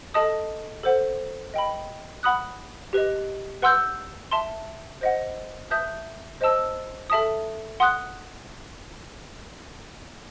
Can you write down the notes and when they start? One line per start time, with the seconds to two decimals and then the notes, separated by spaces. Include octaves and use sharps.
0.14 A4 D#5 A5 D#6
0.83 A4 C5 F#5
1.54 D#5 G5 B5
2.23 F#5 B5 D#6 F#6
2.93 G4 B4 D#5
3.62 B4 F#5 C6 E6 G6
4.31 E5 A5 C6
5.01 C5 D#5 F#5
5.70 B4 E5 A5 D#6 G6
6.41 C5 D#5 A5 E6
7.10 A4 E5 A5 D#6
7.80 F#5 C6 D#6 F#6